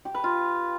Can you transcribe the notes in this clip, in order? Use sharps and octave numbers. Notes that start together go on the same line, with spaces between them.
G4
B4
F4